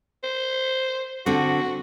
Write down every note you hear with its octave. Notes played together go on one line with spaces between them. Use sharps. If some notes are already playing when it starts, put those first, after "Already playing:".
C5
D3 C4 D4 F#4